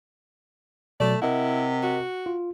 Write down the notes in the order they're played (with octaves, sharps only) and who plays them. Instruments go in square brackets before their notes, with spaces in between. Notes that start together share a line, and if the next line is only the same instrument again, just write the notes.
[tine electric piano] B2 F#3 [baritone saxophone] A3 [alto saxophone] D5
[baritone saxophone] C3 [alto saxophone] E4 [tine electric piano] A#4 D#5 F#5
[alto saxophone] F#4
[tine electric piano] F4